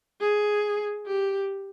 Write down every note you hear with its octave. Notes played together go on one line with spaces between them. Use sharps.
G#4
G4